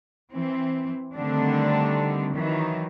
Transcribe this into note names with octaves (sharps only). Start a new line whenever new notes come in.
E3 C4
D3 D#3 G3 A3 C4 D4
D#3 E3 F#3